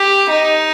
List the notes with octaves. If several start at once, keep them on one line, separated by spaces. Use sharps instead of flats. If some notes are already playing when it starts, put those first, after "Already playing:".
Already playing: G4
D#4